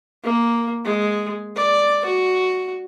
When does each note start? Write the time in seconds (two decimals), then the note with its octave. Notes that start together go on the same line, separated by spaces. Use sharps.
0.24 A#3
0.85 G#3
1.56 D5
2.06 F#4